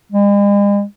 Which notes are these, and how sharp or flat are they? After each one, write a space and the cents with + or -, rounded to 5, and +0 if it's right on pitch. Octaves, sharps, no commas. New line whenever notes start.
G#3 -45